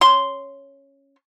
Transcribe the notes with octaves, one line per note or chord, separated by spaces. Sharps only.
C#4 C6